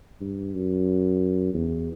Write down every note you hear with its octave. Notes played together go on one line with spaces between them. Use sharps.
G2
F#2
E2